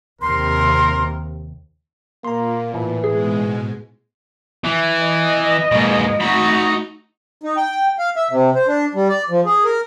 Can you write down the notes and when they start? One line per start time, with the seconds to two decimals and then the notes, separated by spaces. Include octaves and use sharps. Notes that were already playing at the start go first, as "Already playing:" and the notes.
0.22 D#2 C3 A#4 C6
2.25 A#2 A#3 A#5 C6
2.74 A2 E3
3.04 G#2 B2 G#3 G#4
4.64 E3
5.00 D#5
5.72 G#2 B2 G#3 A#3
6.20 A3 D#4 F#4 B5
7.43 D#4
7.57 G5
7.99 F5
8.16 E5
8.31 C3
8.55 C5
8.67 D4
8.94 G3
9.09 D5
9.30 F3
9.45 G#4
9.65 A#4